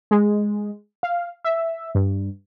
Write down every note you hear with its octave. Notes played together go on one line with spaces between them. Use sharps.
G#3
F5
E5
G2